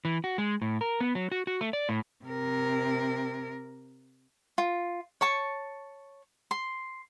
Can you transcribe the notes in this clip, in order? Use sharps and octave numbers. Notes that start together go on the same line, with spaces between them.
E3
F#4
G#3
A2
A#4
B3
F#3
F#4
F#4
A3
D5
A2
C3 A#4
F4
C#5 A5 C#6
C6